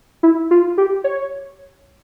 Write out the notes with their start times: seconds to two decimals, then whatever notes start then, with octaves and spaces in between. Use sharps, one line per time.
0.23 E4
0.51 F4
0.78 G4
1.04 C#5